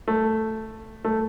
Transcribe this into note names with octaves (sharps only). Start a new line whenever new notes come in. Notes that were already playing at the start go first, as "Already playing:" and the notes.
A3
A3